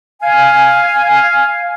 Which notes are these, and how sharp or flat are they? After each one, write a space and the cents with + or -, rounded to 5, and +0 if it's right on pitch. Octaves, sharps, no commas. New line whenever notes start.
F5 +0 G#5 +0